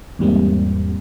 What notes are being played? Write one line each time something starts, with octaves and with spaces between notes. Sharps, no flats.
E2 G#2 G3 A#3 C4